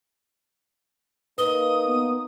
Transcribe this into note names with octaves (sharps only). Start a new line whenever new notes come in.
A#3 D#4 B4 D#6 G7
B3